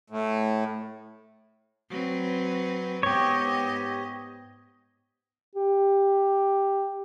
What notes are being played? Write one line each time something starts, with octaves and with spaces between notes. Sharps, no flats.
A2
F#3 C4 B4
G#2 B3 G4 C#5 D#5
G4